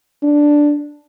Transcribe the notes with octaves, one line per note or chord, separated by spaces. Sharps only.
D4